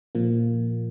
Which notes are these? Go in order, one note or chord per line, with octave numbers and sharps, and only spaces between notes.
A#2 F3 A#3